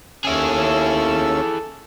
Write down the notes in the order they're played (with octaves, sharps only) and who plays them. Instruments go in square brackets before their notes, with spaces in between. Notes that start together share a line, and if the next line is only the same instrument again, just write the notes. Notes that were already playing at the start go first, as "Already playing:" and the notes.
[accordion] D#2 C#4 E6 [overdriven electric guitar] E4 G#4 [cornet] A4